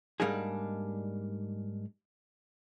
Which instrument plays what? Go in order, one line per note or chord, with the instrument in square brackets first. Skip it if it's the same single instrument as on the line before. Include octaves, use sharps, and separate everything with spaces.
[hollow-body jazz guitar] G#2 G3 A#3 D4 D#4 G#4